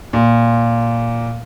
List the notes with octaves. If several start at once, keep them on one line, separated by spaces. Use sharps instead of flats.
A#2